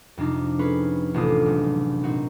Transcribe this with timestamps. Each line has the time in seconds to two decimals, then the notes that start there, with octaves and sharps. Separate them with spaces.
0.17 F2 C3 D4 D#4
0.59 C#4 F4 G#4 B4
1.14 A1 C3 D4 F4 D#6
1.46 F#1
2.03 A#2 C4 D#4 F#4